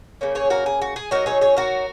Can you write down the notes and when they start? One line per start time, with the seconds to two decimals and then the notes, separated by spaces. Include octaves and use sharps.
0.21 C#3 A#3 C#4
0.35 G#4 C#5
0.50 F#4 A#4
0.66 G#4
0.81 F#4
0.96 G#4
1.11 F#3 D#4 F#4 A#4
1.26 G#4 C#5
1.41 G#4 C#5
1.57 F#4 A#4